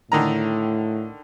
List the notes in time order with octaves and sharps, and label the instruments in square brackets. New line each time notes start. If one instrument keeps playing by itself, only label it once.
[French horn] A2 [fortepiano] D3 D#3 A#5